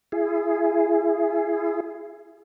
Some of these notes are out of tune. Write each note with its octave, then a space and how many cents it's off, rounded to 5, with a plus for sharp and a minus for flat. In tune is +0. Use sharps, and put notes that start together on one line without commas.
E4 +30 G#4 +0